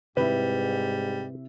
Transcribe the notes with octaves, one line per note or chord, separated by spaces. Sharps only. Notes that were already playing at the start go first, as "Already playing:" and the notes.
G#2 C3 G3 E4 B4 E5